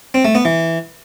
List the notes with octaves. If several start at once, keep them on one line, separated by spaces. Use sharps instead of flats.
C4
A3
B3
E3